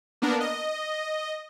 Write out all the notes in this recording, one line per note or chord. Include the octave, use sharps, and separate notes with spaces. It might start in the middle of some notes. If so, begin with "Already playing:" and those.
A#3 B3 D4 A#4
D#5